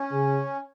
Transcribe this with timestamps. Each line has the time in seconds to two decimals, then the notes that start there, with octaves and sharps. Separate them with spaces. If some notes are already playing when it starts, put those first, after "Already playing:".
Already playing: C#4
0.11 C#3